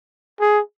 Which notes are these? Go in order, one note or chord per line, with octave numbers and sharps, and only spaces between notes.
G#4